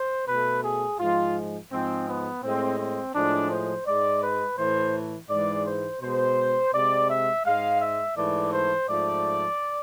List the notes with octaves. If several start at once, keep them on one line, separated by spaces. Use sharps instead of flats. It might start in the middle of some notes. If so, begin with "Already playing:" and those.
Already playing: C5
B2 A3 B4
G#4
G#2 F3 G#3 F4
G#2 F3 G#3 C4
B3
A2 G#3 C4
C4
A2 F3 G#3 D4
C5
G#2 G#3 D5
B4
A2 E3 A3 C5
G#2 E3 G#3 D5
C5
B2 G#3 C5
C3 G#3 D5
E5
G#2 G#3 F5
E5
G#2 E3 A3 D5
C5
G#2 F3 A3 D5